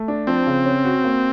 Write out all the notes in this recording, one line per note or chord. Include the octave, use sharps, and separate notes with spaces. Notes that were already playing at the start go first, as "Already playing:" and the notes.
Already playing: A3
D4
F3 C4
C#3
C#4
F#4
A#3